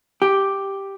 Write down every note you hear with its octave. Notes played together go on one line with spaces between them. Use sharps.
G4